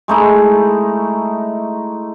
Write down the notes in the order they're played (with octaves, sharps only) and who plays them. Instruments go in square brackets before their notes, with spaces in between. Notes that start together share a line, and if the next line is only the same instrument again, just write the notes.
[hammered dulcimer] G#3 A3 D#4 E4